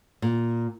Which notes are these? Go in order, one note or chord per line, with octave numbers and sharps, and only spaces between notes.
A#2